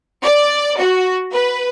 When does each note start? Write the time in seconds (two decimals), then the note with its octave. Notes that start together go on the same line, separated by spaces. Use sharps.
0.24 D5
0.79 F#4
1.32 B4